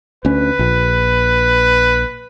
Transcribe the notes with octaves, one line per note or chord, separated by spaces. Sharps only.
D2 C#4 B4
A#1